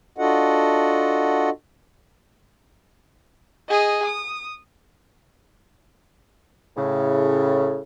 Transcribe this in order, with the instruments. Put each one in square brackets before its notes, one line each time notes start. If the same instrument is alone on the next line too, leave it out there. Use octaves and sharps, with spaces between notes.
[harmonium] D4 F4 F#4 A4 D#5 F#5
[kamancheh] G#4 D#5
D#6
[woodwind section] A2 C#3